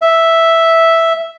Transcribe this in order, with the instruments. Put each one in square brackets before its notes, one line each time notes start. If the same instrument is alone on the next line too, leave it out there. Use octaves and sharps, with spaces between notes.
[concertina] E5